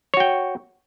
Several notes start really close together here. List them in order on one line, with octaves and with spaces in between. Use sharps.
C#5 F#4 G5